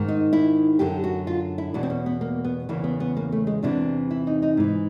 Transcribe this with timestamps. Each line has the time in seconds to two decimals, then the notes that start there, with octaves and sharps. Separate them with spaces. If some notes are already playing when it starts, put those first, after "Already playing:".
Already playing: G#2 D#3
0.08 D#4
0.33 E4
0.79 F#2 D3 G4
1.04 F#4
1.27 F4
1.58 E4
1.74 E2 B2 D4
1.83 C4
1.90 C#4
2.06 B3
2.21 A#3
2.44 B3
2.69 E2 C#3 E3 A#3
2.84 B3
3.00 B3
3.17 A#3
3.32 A3
3.47 G#3
3.63 E2 C3 E3 D4
4.11 E4
4.27 D#4
4.42 D#4
4.57 G#2 E3